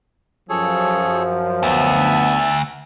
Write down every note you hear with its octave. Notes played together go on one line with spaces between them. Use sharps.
F#2 F3 G#4 A4 C#5
D2 B3 E5 A5